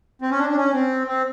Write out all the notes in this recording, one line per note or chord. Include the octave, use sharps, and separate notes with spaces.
C4
C#4
D4
D4
C#4
C4
C4